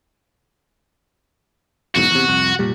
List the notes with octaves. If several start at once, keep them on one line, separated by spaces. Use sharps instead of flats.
B1 E2 G#2 F#4
E2 C3
C2 F2
F1 A#2 G3